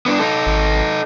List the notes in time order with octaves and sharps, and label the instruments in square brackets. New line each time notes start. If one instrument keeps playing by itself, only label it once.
[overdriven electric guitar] B3 D4
D#4 A4
[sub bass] G#1